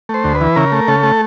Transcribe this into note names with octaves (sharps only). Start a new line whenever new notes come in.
A3 C5
D2
B4
E3
C#3 A#4
A3
C#3 A4
A3